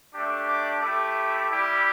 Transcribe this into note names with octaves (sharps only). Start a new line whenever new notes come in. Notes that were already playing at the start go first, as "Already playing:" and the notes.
A3 D4 G4 D6
D6
A3 E4 G4 D6
G3 E4 G4